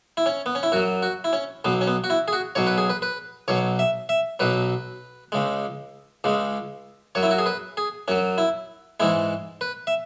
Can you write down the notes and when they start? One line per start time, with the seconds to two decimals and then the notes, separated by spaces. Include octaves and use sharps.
0.17 E4
0.26 C#4
0.46 B3
0.55 C#4
0.63 E4
0.72 F#2 F#3 F#4
1.03 F#4
1.24 E4
1.33 C#4
1.65 B1 B2 F#3 B3
1.81 C#4
1.87 B3
2.04 F#4
2.10 E4
2.28 G#4
2.33 F#4
2.55 B1 B2 F#3 C#5
2.67 B4
2.78 G#4
2.90 B4
3.02 B4
3.48 B1 B2 F#3 C#5
3.79 E5
4.09 E5
4.40 B1 B2 F#3 B4
5.32 C#2 C#3 G#3
6.24 C#2 C#3 G#3
7.15 F#2 F#3 C#5
7.23 E4
7.31 F#4
7.39 G#4
7.46 B4
7.77 G#4
8.08 F#2 F#3 C#4
8.38 E4
9.00 G#2 E3 G#3 E4
9.61 B4
9.87 E5